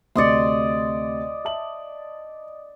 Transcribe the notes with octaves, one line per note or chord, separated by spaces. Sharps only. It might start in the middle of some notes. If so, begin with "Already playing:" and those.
D2 C3 D5 D#5 C6 C#7
E5 A5 F#7